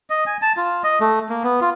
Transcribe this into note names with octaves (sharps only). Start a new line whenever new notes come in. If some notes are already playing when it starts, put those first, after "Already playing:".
D#5
G#5
A5
F4
D#5
A3
A#3
B3
F4